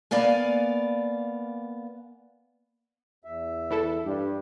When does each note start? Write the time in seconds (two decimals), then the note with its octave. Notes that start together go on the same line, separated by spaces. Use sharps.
0.11 A#3 B3 D5 F5 G#5
3.24 E2 E5
3.71 E3 E4 A4
4.05 G2 G4